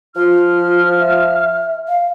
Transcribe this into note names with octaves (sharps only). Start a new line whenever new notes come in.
F3 F4 F6
E5
F5